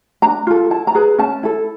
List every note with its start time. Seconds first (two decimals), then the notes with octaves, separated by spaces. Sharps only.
0.22 D4 A#5
0.47 F4 A4
0.70 E4 A5
0.87 A#5
0.95 G#4 B4
1.18 C#4 A5
1.43 E4 A4